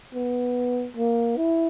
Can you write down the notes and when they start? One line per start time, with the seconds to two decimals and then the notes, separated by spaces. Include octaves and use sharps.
0.15 B3
0.97 A#3
1.37 E4